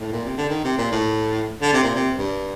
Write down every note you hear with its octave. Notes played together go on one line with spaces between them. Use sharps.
A2
A#2
C3
D3
D#3
C3
A#2
A2
D3
C3
A#2
C3
G2